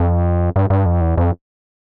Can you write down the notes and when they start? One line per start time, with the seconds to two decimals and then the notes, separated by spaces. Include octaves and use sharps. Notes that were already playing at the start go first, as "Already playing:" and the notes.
Already playing: F2
0.56 G2
0.70 G2
0.86 F2
1.01 E2
1.17 F2